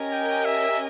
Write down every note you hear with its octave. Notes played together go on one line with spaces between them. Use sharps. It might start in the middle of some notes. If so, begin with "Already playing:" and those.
Already playing: C#4 G4 A#4 D#5 G#5
G5
E5